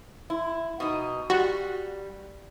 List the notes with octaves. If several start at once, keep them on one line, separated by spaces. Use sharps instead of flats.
E4
B2 D#4
G3 F#4